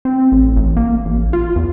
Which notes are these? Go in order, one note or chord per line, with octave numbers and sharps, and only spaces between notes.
C4
A1
A1
A#3
A1
F4
E2